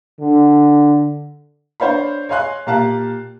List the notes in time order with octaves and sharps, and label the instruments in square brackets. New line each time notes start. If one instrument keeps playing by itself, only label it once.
[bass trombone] D3
[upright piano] D4 C5 C#5 F5 B5
C#5 D#5 F5 G#5 C6 F#6
A#2 G4 F5 A5 A#5 F#6